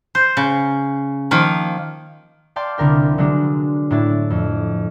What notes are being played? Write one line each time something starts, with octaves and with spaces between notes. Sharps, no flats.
C5
C#3
D#3 F3 A#3
D5 F5 G5 A5 C6 D6
C2 D3 A#4 G5
D3 F#3 G#3 D4
A2 D4 E4 A6
F2